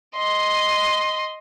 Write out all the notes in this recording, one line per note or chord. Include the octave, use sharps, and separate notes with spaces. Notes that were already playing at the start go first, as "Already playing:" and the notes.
D#5 C6